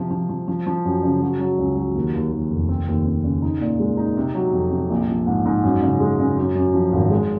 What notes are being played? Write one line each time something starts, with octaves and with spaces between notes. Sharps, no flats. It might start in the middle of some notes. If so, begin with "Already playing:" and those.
Already playing: C3 F3
F3
F3
F3
F3
F#2
C#3
F#3
F#3
C#2
F#3
D#2
D#2
D#2
F1
C4
D#2
C4
C#3
D#4
A#2
G#3
D#4
C3
F#3
F2
C3
A#1
F3
G#2
G#2
F#2
C#3
G#3
C#3
F#2
F#2
F3
G#1
G#3